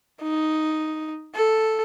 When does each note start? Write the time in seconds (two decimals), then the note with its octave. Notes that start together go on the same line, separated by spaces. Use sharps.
0.22 D#4
1.35 A4